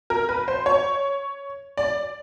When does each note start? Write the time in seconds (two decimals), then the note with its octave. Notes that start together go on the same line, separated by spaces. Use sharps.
0.10 A#4
0.29 B4
0.48 C5
0.66 C#5
1.77 D5